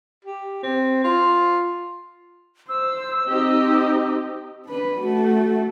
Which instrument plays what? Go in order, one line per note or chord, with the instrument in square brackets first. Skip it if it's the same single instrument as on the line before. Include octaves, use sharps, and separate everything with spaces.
[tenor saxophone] G4
C4
F4
[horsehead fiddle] C5 [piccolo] E6
[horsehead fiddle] C4 D#4 [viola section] G4 D#5
[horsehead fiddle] D4 B4
A3 F#4